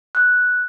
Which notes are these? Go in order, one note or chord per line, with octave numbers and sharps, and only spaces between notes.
F#6